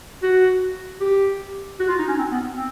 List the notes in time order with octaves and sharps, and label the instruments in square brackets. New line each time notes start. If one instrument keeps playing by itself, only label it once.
[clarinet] F#4
G4
F#4
F4
D#4
C#4
C4
B3
C4